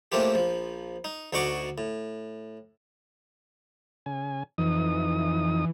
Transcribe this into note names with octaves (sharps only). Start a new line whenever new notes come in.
A2 A3 A#3 C4 F4 G4
A#1 F3
D#4
D2 D3 D#4 F#4 C#6 D6
A2
C#3 G#5
F2 E3 D#4 D#6